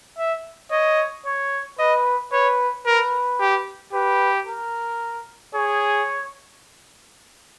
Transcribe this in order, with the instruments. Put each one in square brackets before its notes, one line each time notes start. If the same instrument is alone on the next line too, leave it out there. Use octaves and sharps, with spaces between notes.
[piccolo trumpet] E5
[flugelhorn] C#5 [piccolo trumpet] D#5
[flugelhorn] C#5
[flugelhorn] B4 [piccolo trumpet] D#5
[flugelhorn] B4 [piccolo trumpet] C#5
[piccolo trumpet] A#4 [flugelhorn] B4
[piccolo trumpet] G4
[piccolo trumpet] G4 [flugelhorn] B4
[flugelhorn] A#4
[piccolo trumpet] G#4 [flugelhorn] C#5